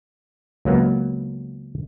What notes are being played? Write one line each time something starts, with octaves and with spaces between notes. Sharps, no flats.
C#2 F#3 A#3 B3